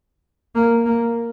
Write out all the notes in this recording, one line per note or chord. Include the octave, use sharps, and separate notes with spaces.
A#3
A#3